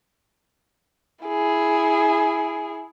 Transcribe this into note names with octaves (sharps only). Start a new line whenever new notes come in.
E4 G#4